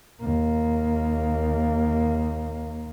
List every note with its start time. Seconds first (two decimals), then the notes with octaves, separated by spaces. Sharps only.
0.21 D#2 A#3